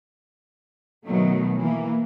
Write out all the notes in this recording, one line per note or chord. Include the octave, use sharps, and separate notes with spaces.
B2 D#3 F#3 A3
E3 A#3